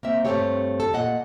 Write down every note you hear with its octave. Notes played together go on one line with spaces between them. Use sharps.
A#3 C4 E5
G2 C#3 A3 C4 G4 C#5
A4
A#2 D#5 F#5